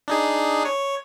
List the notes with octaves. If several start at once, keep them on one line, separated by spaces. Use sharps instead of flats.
D4 D#4 G#4
C#5